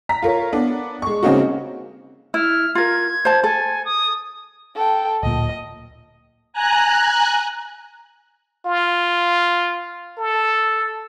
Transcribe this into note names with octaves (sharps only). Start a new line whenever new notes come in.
A#5 B6
F4 A#4 C#5
B3 D4
G#3 C#6
C#3 A#3 C4 C#4 D#4 F#4
E4 F6
F4 A#4 G#6
C5 A5
A4 G#5
D#6
A4 G5
D1 A#2 D#5
G#5 A#5 F#6
F4
A4